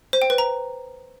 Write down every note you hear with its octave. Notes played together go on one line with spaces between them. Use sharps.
C5
G5
B4
A#5